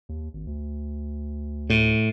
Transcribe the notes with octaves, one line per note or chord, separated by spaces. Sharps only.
D#2
G#1
D2
A2